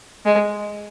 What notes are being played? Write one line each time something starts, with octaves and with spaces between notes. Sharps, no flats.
G#3